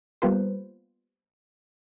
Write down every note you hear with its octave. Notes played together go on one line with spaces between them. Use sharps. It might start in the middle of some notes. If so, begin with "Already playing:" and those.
G3 A#3 B3 F4 B4 C5